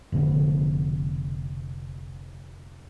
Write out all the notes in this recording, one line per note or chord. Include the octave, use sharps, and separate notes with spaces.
F1 B2 D3